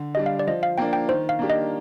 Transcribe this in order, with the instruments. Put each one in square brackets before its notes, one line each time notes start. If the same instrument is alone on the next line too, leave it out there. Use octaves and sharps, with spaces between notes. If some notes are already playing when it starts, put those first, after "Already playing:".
Already playing: [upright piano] D3
[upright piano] G3 D4 [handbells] D#5
[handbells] F5
D5
[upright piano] F3 [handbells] D#5
[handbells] F5
[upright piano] A#3 D4 [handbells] G5
[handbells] G5
[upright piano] D#3 [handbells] C5
[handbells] F5
[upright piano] A#3 D4 G4
[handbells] D#5